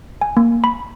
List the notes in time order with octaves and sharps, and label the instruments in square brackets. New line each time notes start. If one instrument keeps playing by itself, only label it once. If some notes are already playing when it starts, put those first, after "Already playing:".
[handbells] G#5
A#3
B5